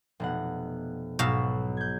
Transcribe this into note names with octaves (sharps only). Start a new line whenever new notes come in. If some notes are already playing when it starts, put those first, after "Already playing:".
F1 B2 F#5
B1 G#2 B2 F5 E6
G6 G#6